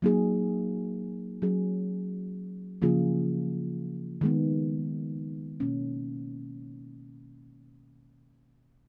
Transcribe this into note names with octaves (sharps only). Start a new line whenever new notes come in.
F#3 A#3 D#4 G#4
F#3 C#4 G#4
C#3 F3 A#3 F4 G#4
D#3 G#3 B3
B2 A#3 C#4